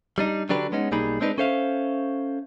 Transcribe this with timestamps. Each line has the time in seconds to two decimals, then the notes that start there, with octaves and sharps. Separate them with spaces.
0.18 G3 D4 D#4
0.49 D3 F#3 D4 G4 B4
0.72 G#3 B3 C#4 D#4
0.92 B1 G3 A#3 D#4 G#4 B5
1.20 G#3 C4 D4 D#4 B4
1.38 C#4 A4 C5 E5 F5